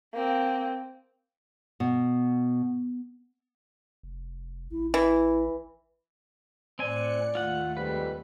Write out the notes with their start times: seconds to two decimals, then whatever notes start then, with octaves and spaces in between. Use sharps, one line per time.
0.14 A#3 C4
1.80 B2
4.03 F1
4.72 A1 E4
4.94 E3 E4
6.79 A2 C4 D5 G#5 F#6 C#7
7.35 D#2 A3 F4 F#5
7.77 F2 G#2 G3 B4